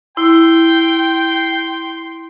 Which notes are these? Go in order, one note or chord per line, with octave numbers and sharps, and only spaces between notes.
E4 G5 C6